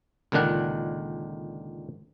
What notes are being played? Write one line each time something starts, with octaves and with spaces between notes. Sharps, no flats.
C#2 A#2 D3 D#3 D4 F#5